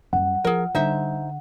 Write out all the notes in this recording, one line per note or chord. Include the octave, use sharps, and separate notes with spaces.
F#2 G3 F#5
F3 F4 G#4 A#4
D3 G3 D#4 C5 E5